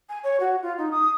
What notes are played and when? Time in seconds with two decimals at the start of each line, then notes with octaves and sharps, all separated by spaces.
0.09 G#5
0.23 C#5
0.40 F#4
0.62 F4
0.77 D#4
0.91 D#6